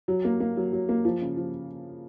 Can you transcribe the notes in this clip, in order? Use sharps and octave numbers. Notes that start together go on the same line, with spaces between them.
F#3
A#3
A#3
F#3
F#3
A#3
F3
C#3
F3